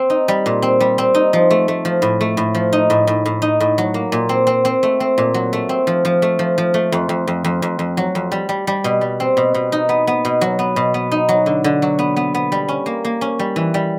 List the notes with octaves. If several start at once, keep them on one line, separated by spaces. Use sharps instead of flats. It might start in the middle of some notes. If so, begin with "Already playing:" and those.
Already playing: C4
D#4
G3
A#2
C4
G3
C4
D#4
F3
A3
A3
F3
A2
A3
A2
F3
D#4
A2
A2
A2
D#4
A2
F#3
A#3
A#2
C4
C4
C4
A3
C4
A#2
F#3
A3
C4
F3
F3
A3
F3
F3
A3
F2
F2
F2
F2
F2
F2
F#3
F2
G3
G3
G3
B2
G3
C4
B2
B2
D#4
B3
B3
B2
F#3
B3
B2
B3
D#4
F#3
D3
D3
F#3
B3
B3
B3
G3
C#4
A#3
A#3
C#4
G3
E3
G3